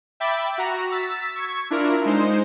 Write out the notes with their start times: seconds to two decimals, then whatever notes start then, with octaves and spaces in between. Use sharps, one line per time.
0.20 E5 G5 B5 D6 A6
0.58 F#4 A#5
0.91 E6 A6 B6
1.36 C#6 G#6
1.70 D4 E4 F4 A#4
2.05 G#3 D#4 C5